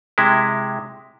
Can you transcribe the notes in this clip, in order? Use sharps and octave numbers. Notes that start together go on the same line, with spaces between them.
C3 G#3 E4